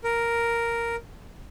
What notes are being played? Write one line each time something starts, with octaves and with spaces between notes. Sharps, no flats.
A#4